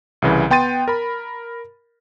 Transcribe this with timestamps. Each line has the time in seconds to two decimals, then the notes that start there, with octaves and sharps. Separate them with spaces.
0.22 C2 C#3 E3
0.50 B3 G5 C6 A6 D#7
0.88 A#4 B5